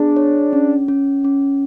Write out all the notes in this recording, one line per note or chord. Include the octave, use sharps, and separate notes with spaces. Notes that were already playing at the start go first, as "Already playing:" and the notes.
Already playing: B3 D4 G#4
C#5
C#4
C#4
C#4